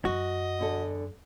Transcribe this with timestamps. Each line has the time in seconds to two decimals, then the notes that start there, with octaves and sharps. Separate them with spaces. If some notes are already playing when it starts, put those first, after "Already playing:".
0.05 F#2 F#4 D#5
0.59 E2 D3 A4